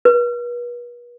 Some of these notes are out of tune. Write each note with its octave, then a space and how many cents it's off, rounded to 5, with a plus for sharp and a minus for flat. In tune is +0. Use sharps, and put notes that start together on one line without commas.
B4 -40